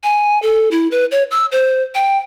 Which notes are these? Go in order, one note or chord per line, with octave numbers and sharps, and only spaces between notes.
G#5
A4
E4
B4
C#5
E6
C5
G5